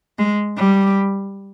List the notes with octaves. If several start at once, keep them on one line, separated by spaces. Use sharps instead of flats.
G#3
G3